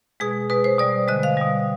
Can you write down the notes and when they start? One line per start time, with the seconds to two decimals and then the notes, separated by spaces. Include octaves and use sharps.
0.20 B2 G#3 G#4
0.50 B2 G#3 B4
0.64 C5
0.79 B2 G3 D5
1.08 D3 G#3 D#5
1.23 F5
1.37 B2 G3